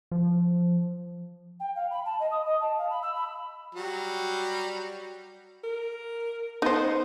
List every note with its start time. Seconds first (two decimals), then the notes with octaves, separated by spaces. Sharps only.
0.12 F3
1.60 G5
1.75 F5
1.90 B5
2.05 A5
2.19 D#5
2.31 D#6
2.46 D#5
2.60 A5
2.78 F5
2.90 B5
3.02 E6
3.15 B5
3.75 F#3 G3
5.64 A#4
6.62 B3 D#4 C5